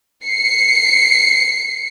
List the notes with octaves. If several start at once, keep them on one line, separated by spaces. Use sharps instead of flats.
C7 C#7